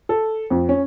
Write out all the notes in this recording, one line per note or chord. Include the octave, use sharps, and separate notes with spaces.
A4
F2
C#4